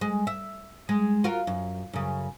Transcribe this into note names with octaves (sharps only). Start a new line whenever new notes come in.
G#3
E5
G#3
F4 F#4 A#4
F#2
F#2 C#3